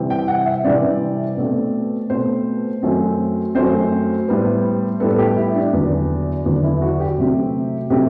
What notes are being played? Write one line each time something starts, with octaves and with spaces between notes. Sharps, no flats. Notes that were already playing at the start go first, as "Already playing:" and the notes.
Already playing: C3 E3 G3 C4
G5
F#5
E5
C3 E3 G3 C4 D5
B2 A3 C4
B2 A3 C4 C5
F#2 F#3 A3 C4
F#2 F#3 A3 C4 C5
A2 G3 B3
A2 G3 B3 A4
A4
G4
E4
D4
E2 D3 F#3 B3
E2 D3 F#3 B3
E4
F#4
G4
C3 F#3 A3 C4
C3 F#3 A3 C4 G4